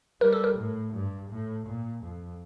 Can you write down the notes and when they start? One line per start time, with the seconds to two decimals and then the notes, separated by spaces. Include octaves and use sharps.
0.21 G3 A#4
0.32 A4
0.44 A#4
0.58 A2
0.94 G2
1.30 A2
1.66 A#2
2.03 F2